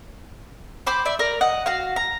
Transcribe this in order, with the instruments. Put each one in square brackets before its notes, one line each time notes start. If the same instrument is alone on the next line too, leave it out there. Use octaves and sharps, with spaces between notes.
[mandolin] C5 B5 D6
D5 E5
A#4 D5 A#5
D#5 F#5
F#4 F5
A#5